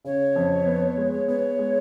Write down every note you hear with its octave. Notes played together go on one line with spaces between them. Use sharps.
C#3 C#5
F2
B3
G#3
B3 C#5
G#3